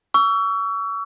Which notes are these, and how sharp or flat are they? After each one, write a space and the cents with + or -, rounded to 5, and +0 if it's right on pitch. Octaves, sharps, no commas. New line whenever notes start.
C#6 +35 E6 +15